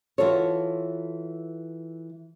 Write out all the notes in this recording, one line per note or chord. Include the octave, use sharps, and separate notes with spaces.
E3 F4 F#4 A4 C#5